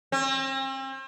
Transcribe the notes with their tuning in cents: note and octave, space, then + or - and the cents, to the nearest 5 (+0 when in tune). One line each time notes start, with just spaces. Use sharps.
C4 +40